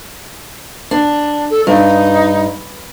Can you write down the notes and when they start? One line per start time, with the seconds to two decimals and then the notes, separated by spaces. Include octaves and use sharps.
0.91 D4
1.50 A4
1.67 G2 D#4